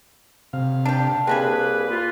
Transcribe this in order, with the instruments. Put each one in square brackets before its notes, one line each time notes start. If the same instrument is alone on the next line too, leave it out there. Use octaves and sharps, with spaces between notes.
[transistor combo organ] C3 F5
[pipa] D4 G4
[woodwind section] C2 A#3 B4 [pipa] C4 D4 G#5 [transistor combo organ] G#4
[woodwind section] F4